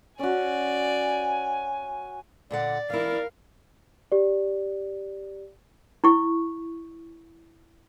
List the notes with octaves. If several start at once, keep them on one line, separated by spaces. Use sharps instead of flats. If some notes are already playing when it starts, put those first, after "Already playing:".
C#4 F#4 D5 G#5
A#2 D3 D5 F#5
E3 E4 A#4 F5
G4 D5
E4 C#6